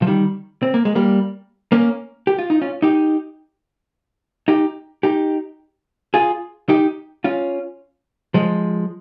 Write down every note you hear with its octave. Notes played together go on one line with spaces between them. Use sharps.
F3
D#3 G3
C4
A#3
G#3
G3 A#3
A#3 C#4
G4
F4
D#4
C#4 F4
D#4 G4
D#4 G4
D#4 G4
F4 G#4
D#4 G4
C#4 F4
F3 G#3